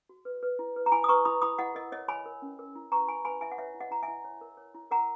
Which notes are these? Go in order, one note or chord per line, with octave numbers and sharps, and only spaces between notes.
F#4
B4
B4
E4
B4
A#5
E4 G#5 B5
D#6
B4 A#5 C#6
E4 B5 D#6
E4 B5 D#6
E4 D#5 F#5
A#4 D#5
C#5 D#5
C#5 G#5 B5
A#4
C#4
A#4
E4
B4 A#5 C#6
E4 G#5 B5
B4 G#5 B5
E4 E5 G#5
F#5
B4 C#5 E5
E4
D#5 F#5
E4 A#5
E5 G#5
E4
C#5
A#4
C#5
E4
A#4 F#5 A#5